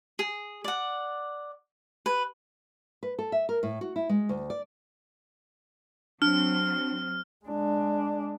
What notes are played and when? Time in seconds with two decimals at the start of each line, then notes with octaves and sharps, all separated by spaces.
0.19 G#4
0.64 D5 F#5
2.06 B4
3.03 B4
3.19 A4
3.32 E5
3.49 A#4
3.63 A2
3.81 F#4
3.96 E4
4.09 G#3
4.29 D2
4.50 D5
6.22 F#3 C4 D4 F6
7.46 G#3 D4